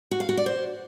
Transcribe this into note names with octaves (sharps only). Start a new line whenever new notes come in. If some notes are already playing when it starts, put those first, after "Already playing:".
F#4
F5
F#4
D5
C5